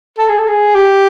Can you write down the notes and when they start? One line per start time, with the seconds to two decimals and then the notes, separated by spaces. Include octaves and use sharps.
0.19 A4
0.29 G#4
0.38 A4
0.48 G#4
0.75 G4